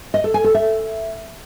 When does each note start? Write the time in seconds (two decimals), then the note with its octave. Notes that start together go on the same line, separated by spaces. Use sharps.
0.14 D#5
0.24 A4
0.34 G#5
0.44 A4
0.54 E5